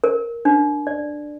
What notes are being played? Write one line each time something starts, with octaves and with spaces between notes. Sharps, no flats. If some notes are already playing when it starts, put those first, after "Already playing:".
A#4
D4
D5